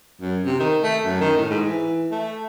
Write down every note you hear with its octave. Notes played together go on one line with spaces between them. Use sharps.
F#2
C3
D#3
A3
F#2
D#3
A2
G#2
E3
A3